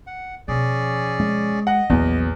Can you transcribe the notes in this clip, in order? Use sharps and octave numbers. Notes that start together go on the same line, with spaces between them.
F#5
B2 F3 C#4 G#4 D5
G#3
D#5 F#5
A#1 E2 E3 F#3